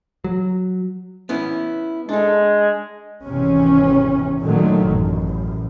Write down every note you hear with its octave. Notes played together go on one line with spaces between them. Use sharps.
F#3
B3 C#4 E4
G#3 D4 A4
G#1 E2 C3 C#4
A#2 D3 D#3 F#3 A3
A1 F#2